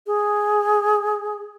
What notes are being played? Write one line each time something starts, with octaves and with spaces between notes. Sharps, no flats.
G#4